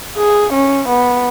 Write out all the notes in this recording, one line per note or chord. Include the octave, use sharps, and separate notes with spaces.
G#4
C#4
B3